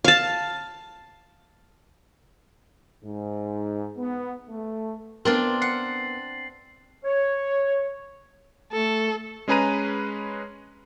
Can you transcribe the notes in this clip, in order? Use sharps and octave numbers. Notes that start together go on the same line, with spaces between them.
F5 A5
G#2
B3
A3
B3 C4 D4 F4 A#4 A6 F#7
F#5 C7
C#5
A3 A4
G#3 C#4 G#4 B4 A#5 D#7